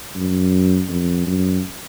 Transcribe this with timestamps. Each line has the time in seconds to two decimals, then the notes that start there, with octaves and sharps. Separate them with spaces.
0.16 F#2
0.89 F2
1.27 F#2